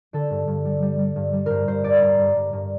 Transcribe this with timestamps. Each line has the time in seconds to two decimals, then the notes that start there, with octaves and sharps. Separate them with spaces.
0.13 D3 A4
0.30 G2
0.48 G2
0.65 G3
0.82 G3
0.99 G3
1.16 G2
1.33 G3
1.46 G2 A#4 C5
1.68 G2 C5
1.84 G2 D5
2.02 G2 A#5
2.19 G2
2.36 G2
2.53 G2